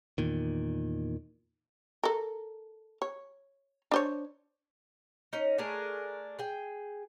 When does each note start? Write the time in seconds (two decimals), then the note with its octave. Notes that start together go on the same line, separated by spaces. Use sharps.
0.18 E2 A#2 D#3
2.03 A4 A#4
3.02 C#5
3.91 D4 C5 C#5
5.33 C#4 D#4
5.58 A3 D4 G#4 A#4
6.39 G#4 G5